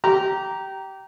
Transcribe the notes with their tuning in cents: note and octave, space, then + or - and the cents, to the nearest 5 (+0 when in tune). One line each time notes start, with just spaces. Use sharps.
G4 -20 A#5 +0